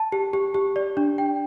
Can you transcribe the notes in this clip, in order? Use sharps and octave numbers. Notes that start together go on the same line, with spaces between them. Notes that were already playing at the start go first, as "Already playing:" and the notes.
Already playing: A5
G4
G4
G4
D5
D4
G5